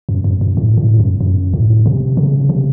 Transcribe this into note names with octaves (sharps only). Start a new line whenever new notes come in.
F#2
F#2
F#2
A2
A2
F#2
F#2
A2
C3
C#3
C3